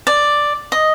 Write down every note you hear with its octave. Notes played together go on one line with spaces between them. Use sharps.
D5
D#5